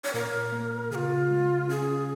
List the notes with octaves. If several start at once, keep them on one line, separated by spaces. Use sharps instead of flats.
C#5
A#2 A#4
A#3
C#3 F4 G#4
G#3
C#4 G#4